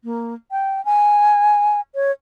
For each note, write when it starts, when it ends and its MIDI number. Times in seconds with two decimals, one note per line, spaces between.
0.04 0.34 58
0.51 0.84 79
0.85 1.80 80
1.95 2.11 73